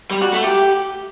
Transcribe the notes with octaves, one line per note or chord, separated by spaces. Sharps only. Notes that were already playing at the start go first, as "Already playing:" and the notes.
G3
F#4
A3
G4